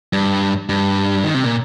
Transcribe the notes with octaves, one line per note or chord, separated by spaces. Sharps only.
G2
G2
D#3
C3
A#2